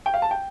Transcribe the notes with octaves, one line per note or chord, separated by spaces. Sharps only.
G5
F5
A5
G5